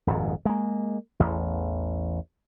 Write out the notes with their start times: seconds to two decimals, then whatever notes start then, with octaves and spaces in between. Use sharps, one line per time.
0.07 D#1 G#1 F2 G#2
0.45 G#3 A#3
1.20 A1 E2